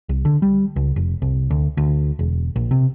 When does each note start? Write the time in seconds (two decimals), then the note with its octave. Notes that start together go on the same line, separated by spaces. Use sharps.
0.09 C2
0.25 D3
0.42 G3
0.76 C#2
0.96 F1
1.22 C2
1.50 D2
1.77 D2
2.19 E1
2.56 A#1
2.71 C3